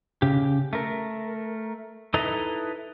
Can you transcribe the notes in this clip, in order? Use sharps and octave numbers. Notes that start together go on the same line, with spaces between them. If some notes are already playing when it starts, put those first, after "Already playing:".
C#3 G4
A3 A#4
D#4 E4 A4 B4 D#5 A#5